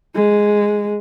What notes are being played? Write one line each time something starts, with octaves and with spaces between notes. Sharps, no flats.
G#3